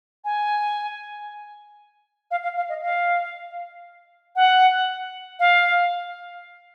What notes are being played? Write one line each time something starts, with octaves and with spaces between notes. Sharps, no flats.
G#5
F5
F5
F5
D#5
F5
F#5
F5